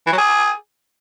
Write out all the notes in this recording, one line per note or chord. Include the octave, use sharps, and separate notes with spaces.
E3
F#3
G#4